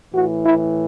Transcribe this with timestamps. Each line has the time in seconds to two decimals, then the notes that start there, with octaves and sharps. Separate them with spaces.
0.14 A2 E3 F#4
0.45 E4